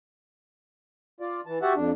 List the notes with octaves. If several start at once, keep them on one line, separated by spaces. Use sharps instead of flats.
F4 D5
E3 A5
F#4 G4 E5 F#5 A5
F2 D4